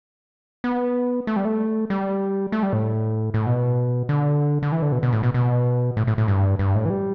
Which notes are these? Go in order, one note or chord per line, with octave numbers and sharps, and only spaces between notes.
B3
A3
G3
A3
G3
A3
G3
A2
A2
B2
D3
D3
E3
D3
B2
B2
A2
B2
B2
A2
A2
A2
G2
G2
A2
E3
G3